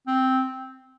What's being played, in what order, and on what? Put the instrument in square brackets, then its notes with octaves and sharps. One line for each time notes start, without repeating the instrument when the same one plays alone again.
[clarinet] C4